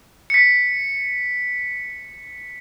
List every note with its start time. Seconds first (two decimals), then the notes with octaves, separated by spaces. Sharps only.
0.30 B6 C#7